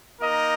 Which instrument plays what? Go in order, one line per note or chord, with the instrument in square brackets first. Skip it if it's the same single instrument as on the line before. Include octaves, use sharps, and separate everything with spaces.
[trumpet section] A#3 D#4 A#4 D#5